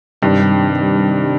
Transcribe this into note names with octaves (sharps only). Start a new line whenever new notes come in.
G2 C3 D#3 G3 D4